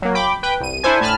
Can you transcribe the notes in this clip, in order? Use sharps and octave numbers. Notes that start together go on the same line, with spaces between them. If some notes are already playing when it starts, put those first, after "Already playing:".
F#3 A#3
G5 B5 D6
B4 G5
C2 D#7
D4 E4 A4 C5 G#5
A2 G#5 A5 B5 F6